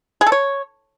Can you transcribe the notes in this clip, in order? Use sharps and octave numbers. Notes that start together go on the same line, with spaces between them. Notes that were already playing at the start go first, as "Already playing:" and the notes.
G#4
A4
C#5